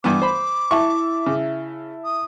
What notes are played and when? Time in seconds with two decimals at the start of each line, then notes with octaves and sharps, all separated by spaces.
0.04 G2 E3 B3 D6
0.22 C5 B5
0.71 E4 E5 A5 C#6
1.26 C#3
2.05 D#6